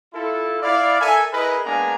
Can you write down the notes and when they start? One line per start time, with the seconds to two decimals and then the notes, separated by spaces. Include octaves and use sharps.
0.13 E4 F4 A4
0.62 E4 D5 F5
1.00 A4 A#4 E5 G#5
1.32 E4 G#4 A#4 B4 D#5
1.65 G#3 A#3 B3 D4 G#5 A#5